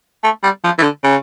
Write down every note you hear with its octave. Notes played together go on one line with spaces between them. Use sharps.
A3
G3
F3
E3
D3
C#3